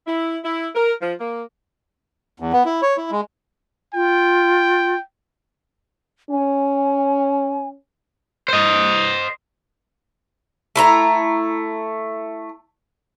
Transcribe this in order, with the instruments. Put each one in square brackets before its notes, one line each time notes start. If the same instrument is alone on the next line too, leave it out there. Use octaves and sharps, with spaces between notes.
[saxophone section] E4
E4
A#4
F3
A#3
[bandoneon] E2
B3
E4
C#5
E4
G#3
[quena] F4 [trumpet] G5
[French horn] C#4 [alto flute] G#5
[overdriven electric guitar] C5 D#5
[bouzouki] A3 E4 A#5